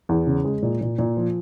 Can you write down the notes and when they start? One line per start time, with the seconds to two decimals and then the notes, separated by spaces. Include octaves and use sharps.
0.09 E2
0.27 C#3
0.44 G#3
0.63 A#2
0.81 A#2
0.99 A#2
1.17 F3